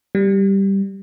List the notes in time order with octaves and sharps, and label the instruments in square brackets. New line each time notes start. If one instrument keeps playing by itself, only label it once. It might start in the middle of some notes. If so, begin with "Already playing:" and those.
[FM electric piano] G3